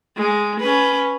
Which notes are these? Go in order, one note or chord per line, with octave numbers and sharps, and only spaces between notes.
G#3
C#4 B4